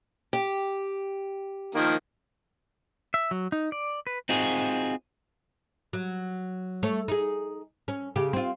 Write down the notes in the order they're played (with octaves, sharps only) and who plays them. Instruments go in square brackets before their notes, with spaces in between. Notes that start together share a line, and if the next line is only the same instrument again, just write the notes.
[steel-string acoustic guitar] G4
[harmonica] D#3 F3 A#3
[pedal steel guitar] E5
F#3
D#4
D5
B4
[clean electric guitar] C4 D#4 F4 F#4 G#4
[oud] F#3
A3 C#5
D#4 G#4
C#4
C#3 G4
C4 F4